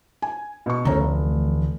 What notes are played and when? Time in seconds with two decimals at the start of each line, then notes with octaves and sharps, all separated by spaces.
0.22 G#5
0.66 B2 C#6
0.85 D2 E3 A3 C#4 A#5
1.00 F1